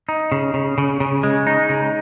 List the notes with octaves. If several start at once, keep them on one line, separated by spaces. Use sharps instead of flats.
D#4
C#3
C#3
C#3
C#3
G#3
D#4
C#3